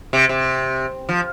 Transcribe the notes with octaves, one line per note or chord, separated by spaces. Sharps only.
C3
C3
F3